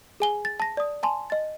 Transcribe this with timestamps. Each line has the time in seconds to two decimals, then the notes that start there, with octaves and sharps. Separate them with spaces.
0.20 G#4 G#5 G7
0.45 A6
0.60 A5 A#6
0.77 D5 D#6
1.03 G#5 A5 C6
1.30 D#5 A6